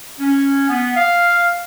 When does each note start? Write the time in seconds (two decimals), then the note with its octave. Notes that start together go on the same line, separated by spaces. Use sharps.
0.20 C#4
0.69 B3
0.96 F5